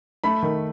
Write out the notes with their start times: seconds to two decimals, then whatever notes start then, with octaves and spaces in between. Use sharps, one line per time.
0.24 A3 B5
0.43 D#3